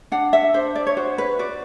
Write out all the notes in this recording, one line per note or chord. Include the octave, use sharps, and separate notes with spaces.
D4 F#5
E5
D4 C5
D5
C#5
F#4 C5
B4
F#4 D5